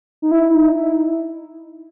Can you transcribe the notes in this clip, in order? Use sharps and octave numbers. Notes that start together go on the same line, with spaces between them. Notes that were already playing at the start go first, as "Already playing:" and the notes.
D#4
E4
D#4
E4